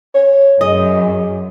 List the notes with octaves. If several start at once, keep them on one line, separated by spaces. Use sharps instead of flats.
C#5
F#2 G#4 D#5